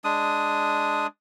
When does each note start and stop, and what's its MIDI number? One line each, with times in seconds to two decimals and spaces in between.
0.04 1.07 56
0.04 1.07 62
0.04 1.07 87